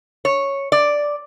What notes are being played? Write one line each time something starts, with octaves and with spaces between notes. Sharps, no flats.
C#5
D5